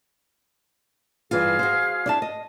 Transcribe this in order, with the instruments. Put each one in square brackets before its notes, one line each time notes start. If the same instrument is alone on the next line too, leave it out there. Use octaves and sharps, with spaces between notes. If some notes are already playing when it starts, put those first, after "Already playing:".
[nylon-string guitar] G2 E3 F4 [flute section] G#4 F5 F6
[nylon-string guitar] F#4 C5
D4 E4 A5
D#5